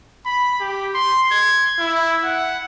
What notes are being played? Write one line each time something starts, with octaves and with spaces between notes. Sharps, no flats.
B5
G4
C6
G#6
E4
F#5